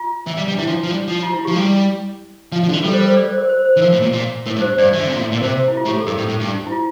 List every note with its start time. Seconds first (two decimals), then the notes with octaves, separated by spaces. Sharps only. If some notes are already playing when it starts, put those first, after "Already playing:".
Already playing: F4
0.27 E3
0.37 G3
0.48 G3
0.54 D4
0.58 E3 E4
0.67 F3
0.84 F3
0.91 G3
1.08 F3
1.23 F4
1.33 E4
1.45 F3 G4
1.56 G3
2.52 F3
2.63 F3
2.69 D3
2.73 E3
2.84 G3 A4
2.93 C5
3.00 A#4
3.08 A4
3.16 D5
3.27 C5
3.38 A#4
3.49 C5
3.65 C5
3.77 E3
3.81 F3 A#4
3.92 A2
4.02 A#2
4.13 A#2
4.46 A2 A#4
4.57 G2
4.61 C5
4.78 G2 D5
4.93 E3
5.00 D3
5.07 C3
5.14 A#2
5.20 A2
5.32 A#2
5.37 A#4
5.43 C3 C5
5.68 E4
5.77 F4
5.86 A2 G4
5.97 A4
6.06 G2 A#4
6.18 A2
6.28 A2
6.40 G2
6.67 E4
6.72 F4